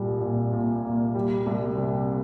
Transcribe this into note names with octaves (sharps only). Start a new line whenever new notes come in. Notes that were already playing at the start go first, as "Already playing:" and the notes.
Already playing: C2 A#2 G3
A#2
A#2
A#3
G3
C2
C3